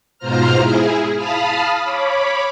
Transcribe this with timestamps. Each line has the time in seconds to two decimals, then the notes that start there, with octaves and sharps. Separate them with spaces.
0.19 G#2 B2 F4 C5 A#5 F6
0.56 E4 G#4
1.15 F5 A5 B5 D#6 F6
1.83 C#5 B5 D6